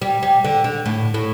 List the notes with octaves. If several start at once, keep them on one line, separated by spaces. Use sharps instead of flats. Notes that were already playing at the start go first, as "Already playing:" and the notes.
G3
G3
D3
D3
A2
A2